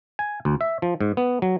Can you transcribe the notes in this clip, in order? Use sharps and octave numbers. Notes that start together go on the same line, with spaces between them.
G#5
D2
E5
F3
G#2
B3
F#3